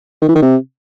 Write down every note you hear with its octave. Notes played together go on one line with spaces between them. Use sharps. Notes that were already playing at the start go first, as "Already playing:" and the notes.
D#3
E3
D#3
C3